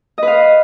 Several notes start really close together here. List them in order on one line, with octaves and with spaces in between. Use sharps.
D#5 B4 F5